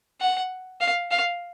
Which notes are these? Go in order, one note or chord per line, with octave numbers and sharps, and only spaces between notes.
F#5
F5
F5